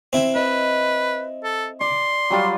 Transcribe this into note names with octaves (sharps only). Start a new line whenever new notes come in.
C4 E4
B4 D#5
A4
D5 C6
F#3 G3 F4